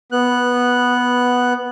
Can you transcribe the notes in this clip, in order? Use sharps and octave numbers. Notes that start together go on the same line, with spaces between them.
B3 F#6